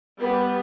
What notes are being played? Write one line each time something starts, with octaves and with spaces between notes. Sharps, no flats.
G3 B3